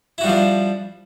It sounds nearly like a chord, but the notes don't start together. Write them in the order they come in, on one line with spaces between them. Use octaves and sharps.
E4 F#4 G3 F3 D4